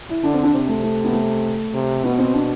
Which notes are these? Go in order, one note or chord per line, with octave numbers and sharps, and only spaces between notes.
E4
D3 D4
C4
D4
C3 C4
A3
A3
B3
A3
C3
B2 B3
C4
D4